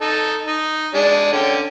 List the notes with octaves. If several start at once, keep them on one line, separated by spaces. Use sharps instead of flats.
D#4 A4
D#4
G#3 D4
D3 C#4 G5